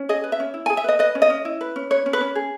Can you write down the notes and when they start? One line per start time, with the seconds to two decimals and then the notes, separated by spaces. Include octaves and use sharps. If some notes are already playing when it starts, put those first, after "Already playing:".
Already playing: C#4
0.09 G#4 D#5
0.24 B4
0.32 E5
0.40 C#4
0.54 E4
0.66 G#5
0.70 G#4
0.77 E5
0.84 B4 D#5
0.99 B4 D#5
1.15 C#4
1.22 D#5
1.30 C#4
1.45 E4
1.61 B4
1.76 C#4
1.90 B4 C#5
2.06 C#4
2.13 B4
2.21 C#4
2.35 G#4